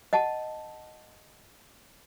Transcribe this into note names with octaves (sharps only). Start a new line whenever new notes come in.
D#5 F#5 A5